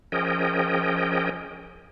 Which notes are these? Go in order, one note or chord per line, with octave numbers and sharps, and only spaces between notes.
F3 C#4 G#4 A#4 D#5 G5